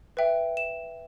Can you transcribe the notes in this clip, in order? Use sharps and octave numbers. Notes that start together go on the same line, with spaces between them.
B4 E5 G5
E7